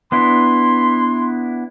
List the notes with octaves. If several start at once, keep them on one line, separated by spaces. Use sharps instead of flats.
B3 D4 E4 C6